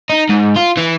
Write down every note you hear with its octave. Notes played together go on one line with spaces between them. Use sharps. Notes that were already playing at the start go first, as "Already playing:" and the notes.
D#4
G#2
F4
E3